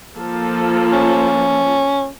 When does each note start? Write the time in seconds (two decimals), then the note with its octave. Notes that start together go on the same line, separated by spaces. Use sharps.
0.15 F3 A#3 A4
0.93 C#4